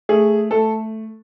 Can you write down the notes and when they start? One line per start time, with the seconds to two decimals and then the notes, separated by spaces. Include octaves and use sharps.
0.09 A3 G#4
0.51 A3 A4